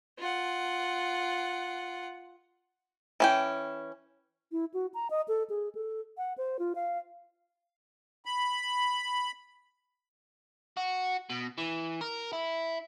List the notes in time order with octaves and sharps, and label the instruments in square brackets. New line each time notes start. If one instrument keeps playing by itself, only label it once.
[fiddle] F4 F#5
[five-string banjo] E3 C#4 G5
[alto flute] E4
F#4
A#5
D#5
A4
G#4
A4
F#5
C5
F4
F5
[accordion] B5
[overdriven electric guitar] F#4
B2
E3
A#4
E4